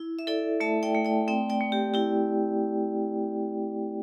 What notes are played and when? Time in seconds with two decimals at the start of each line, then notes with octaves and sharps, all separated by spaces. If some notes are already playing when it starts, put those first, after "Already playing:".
Already playing: E4
0.19 E5
0.27 E4 A4 D5
0.60 A3 E5 A5
0.83 D5 G5
0.95 A3
1.05 D5 G5
1.28 C4 D5 G5
1.50 D5 G5
1.61 A3
1.72 G4
1.94 E4 G4